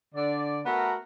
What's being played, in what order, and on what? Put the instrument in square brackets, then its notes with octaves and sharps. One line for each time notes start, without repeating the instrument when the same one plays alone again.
[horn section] D3 D5
A3 B3 F#4 A#4